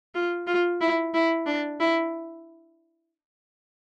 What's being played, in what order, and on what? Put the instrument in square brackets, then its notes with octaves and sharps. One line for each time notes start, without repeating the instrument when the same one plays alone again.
[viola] F4
F4
E4
E4
D4
E4